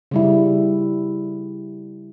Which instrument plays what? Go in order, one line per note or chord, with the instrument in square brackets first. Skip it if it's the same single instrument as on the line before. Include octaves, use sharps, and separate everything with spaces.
[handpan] C#3 G3 E4